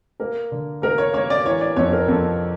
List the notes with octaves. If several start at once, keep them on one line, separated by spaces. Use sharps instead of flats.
A#3 A#4
D3
A#3 A#4
C#5
A#3 C#5
D5
E3 C#5
D5
F2 C#5
A#4
F2 A4